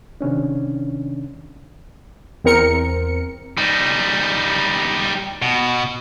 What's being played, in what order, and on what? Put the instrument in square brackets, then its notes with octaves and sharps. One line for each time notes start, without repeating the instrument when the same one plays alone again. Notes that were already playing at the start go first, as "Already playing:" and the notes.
[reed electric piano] C3 D#3 C#4 D4
[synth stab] E2 C4 A#4 C#7
[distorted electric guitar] G3 D#4
B2